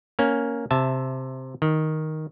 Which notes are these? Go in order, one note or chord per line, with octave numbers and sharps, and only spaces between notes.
A#3 C#4
C3 E5 A5
D#3